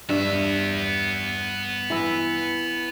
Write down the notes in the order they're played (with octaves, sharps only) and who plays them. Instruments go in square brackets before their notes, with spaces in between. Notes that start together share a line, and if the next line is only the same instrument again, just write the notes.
[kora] G2 [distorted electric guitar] B3 E5
[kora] E3 E4